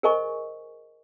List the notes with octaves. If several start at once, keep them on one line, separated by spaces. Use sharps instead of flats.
G#4 A#4 C5 D#5 G#5 C#6